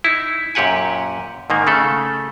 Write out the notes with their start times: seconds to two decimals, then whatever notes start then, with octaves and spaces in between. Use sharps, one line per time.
0.04 D#4 E4
0.55 F#2 A#2 G4 F#5 G#5
1.50 G#2 D#3 A#3
1.67 C#3 A3 A4